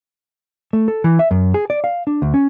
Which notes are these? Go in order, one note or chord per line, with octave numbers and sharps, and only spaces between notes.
A3
A4
E3
E5
F#2
G#4
D5
F5
D4
D2
C#4